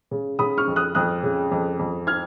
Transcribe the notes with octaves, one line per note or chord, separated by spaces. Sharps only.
C#3
C#3 B5 D#6
C#6 F6
F2
D#6 F#6
F2 D#6 F#6
C#3
F2
F2
F6 G#6